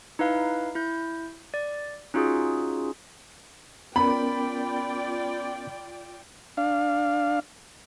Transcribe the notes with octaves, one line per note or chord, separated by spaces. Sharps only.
D#4 E4 B4 F5
E4 G6
D5
C#4 D#4 F4 F#4 G#4
B3 C#4 F4 A#4 D5 G5 B5
D4 F5